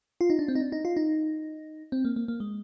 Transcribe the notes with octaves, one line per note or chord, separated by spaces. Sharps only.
F4
D#4
D4
C4
D#4
D4
D#4
F4
D#4
C4
A#3
A#3
A#3
G#3